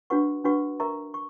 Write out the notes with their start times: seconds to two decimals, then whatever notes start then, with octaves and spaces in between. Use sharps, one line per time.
0.10 D4 F#4 B4 F#5 C#6
0.44 D4 F#4 B4 F#5 C#6
0.80 A#4 E5 A#5 C#6
1.14 C#6